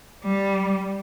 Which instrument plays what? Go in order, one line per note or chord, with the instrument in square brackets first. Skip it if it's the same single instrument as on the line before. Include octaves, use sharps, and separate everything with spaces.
[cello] G3